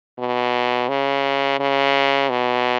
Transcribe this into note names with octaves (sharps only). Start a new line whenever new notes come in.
B2
C#3
C#3
B2